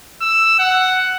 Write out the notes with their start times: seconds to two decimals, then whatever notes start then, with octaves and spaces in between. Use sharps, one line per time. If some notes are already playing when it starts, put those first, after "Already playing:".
0.22 E6
0.59 F#5